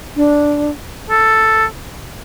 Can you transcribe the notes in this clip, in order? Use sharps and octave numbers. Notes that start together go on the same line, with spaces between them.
D4
A4